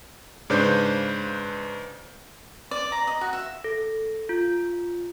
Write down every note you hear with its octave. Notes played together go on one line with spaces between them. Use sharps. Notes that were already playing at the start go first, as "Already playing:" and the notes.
G#2 C#3 D4 B4 C5 G6
D5
A#5
D#5
F#4
E5
A4
F4